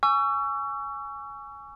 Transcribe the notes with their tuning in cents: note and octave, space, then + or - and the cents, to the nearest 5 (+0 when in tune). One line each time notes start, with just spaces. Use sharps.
G#5 +0 C#6 +25 E6 +35